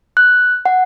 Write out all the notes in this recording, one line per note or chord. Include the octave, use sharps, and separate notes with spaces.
F#6
F#5